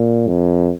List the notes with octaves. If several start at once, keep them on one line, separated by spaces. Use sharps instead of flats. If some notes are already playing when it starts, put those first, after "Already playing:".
Already playing: A#2
F2